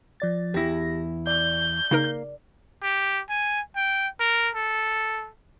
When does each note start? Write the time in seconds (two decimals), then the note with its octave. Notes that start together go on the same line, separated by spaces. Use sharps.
0.20 F3 D5 A6
0.54 E2 E4 G4 A#6
1.27 D5 G6
1.91 C#3 A#3 D#4 A#4
2.83 G4
3.29 G#5
3.76 G5
4.20 A#4
4.55 A4